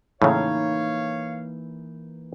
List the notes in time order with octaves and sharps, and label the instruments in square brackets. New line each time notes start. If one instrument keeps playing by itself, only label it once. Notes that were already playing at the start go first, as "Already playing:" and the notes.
[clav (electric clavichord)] A2 C#3 [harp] E3 A#3 D#4 [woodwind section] C#5 F5